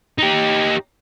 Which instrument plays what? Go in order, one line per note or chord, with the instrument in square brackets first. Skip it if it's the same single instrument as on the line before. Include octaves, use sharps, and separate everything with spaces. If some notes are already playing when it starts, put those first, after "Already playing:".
[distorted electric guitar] D#4 G4